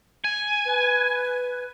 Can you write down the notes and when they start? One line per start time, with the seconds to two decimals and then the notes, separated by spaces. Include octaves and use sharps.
0.24 G#5
0.65 B4